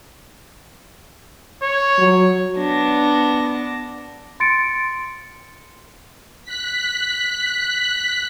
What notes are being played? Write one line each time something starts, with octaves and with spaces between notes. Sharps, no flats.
C#5
F#3
B3 D4 A#6
C6 A6 C#7 D7
F#6 B6